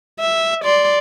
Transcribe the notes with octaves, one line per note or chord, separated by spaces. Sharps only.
E5
D5 C6